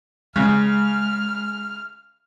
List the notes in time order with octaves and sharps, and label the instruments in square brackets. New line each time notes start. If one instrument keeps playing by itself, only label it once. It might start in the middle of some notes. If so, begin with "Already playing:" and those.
[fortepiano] C#3 [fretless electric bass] G#3 [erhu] F6